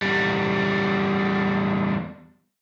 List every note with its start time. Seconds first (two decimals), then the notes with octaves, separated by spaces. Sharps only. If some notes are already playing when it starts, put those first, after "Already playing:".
0.02 E2 G3